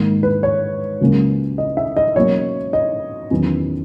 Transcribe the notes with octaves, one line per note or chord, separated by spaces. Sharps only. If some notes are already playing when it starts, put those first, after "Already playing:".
Already playing: G#2 D#3 A#3
B4
C#5
C#2 C#3 F#3 A#3 C#4
D#5
E5
D#5
B2 F#3 A#3 C#4 C#5
D#5
E2 D#3 F#3 C#4